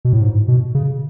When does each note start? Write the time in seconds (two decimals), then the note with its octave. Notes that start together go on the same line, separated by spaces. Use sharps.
0.05 B2
0.13 A2
0.22 G#2
0.48 B2
0.75 C#3